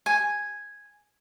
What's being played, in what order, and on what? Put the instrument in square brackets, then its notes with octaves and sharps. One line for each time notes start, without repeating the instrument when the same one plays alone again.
[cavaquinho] G#5